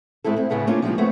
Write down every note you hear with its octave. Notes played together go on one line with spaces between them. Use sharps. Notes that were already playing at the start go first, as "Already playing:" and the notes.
A2 G#3 C4 E4 A4
C4 E4
D2 A2 C#3 B3 A4
A#3 C#4 D4 F4
F3 G3 G#3 A#3 D#4 F4
D#2 A3 B3 C4 C#5